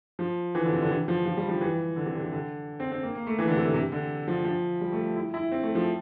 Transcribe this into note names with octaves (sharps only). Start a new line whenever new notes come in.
F3
E3
D3
C3
D3
E3
F3
F3
G3
F3
E3
D3
C3
D3
C3
D3
C4
C4
A#3
A#3
A3
E3
D3
C3
D3
C3
D3
F3
F3
G3
A3
E4
E4
C4
A3
F3